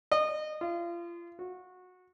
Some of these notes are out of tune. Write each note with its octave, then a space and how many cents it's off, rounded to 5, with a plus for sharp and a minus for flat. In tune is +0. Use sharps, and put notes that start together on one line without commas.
D#5 -25
F4 -30
F#4 -20